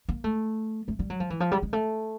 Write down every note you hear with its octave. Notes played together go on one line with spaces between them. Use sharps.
A#3
A3
A3
G3
F#3
F3
E3
F3
G3
G#3
A3